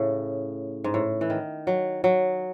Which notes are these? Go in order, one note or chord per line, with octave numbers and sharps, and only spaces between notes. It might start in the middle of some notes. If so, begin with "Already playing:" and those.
Already playing: A2 C#3
G#2
A2
E3
D#3
F#3
F#3